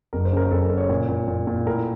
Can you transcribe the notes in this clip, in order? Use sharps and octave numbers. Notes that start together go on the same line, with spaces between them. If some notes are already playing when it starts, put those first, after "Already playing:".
F#1 A#4
C5
C#3 A#4
F#1 A4
A#4
C#3
C#5
A#2
A#2
A#2
A#2
A2 A#4